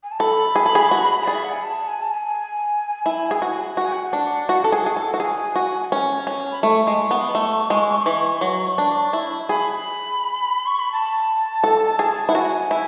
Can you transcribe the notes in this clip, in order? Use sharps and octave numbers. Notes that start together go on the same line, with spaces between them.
G#5
A5
A4 B5
G#4
A4
G#4
F#4
G#4 D5
E5
F#5
G#5
A5
G#5
A5
G#5
E4
G#4
F#4
F#4 F#5
G#5
F#5
D4
F#4
A4
G#4
G#4
A4
F#4
G#4 G#5
F#4
C#4
C#4
B5
A3 C#6
G#3
B3
A3
G#3
E3
F#3
D4
E4
G#4 B5
C#6
B5
A5
A4
G#4
E4 F#5
F#4 G#5
E4